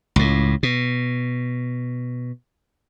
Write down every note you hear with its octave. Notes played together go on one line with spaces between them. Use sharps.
C#2 A2
B2